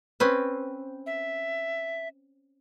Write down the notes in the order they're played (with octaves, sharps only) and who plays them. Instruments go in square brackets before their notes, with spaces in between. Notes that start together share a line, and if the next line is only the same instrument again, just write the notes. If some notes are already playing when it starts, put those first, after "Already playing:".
[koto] C4 C#4 B4
[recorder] E5